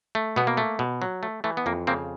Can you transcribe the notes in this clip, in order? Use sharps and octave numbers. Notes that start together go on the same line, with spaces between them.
A3
B2 B3
A#3
A3
B2
F#3
A3
E3 A3
B3
F2 A#3
C#3 A#3 C4